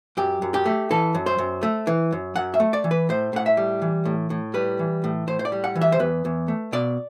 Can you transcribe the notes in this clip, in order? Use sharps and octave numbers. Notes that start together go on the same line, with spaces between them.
F#2 G4
F#2
G4
A3
E3 A4
F#2
C5
F#2
A3
E3
F#2
F#2 F#5
E5
A3
D5
E3
B4
A2 C5
A2 F#5
E5
G3
E3
A2
A2
G3 B4
E3
A2
A2 C5
C5
D5
G3
F#5
E3
E5
C5
E2 B4
E2
A3
B2 D5